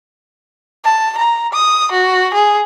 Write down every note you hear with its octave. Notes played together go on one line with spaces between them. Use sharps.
A5
A#5
D#6
F#4
G#4